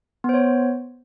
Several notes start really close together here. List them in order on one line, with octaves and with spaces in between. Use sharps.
B3 C5 C#5